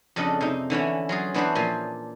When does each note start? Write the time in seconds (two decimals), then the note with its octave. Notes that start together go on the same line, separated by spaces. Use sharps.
0.16 F2 C#3 D4 A4 D#5
0.41 C3 D#4
0.70 D3 E3 C#4 E4
1.09 F#3 F4 G#4
1.34 E3 B3 D4 F#4 B4 C5
1.55 A#2 F3 C5 G#5